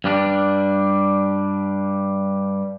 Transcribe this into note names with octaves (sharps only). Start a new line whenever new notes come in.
G2 G3 D4